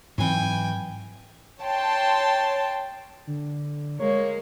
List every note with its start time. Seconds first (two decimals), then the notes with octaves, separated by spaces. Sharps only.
0.18 G#2 E3 F#3 C4 E4 G5 G#5
1.62 C#5 G5 A5 C6
3.27 D3
4.00 G#3 A#3 C#5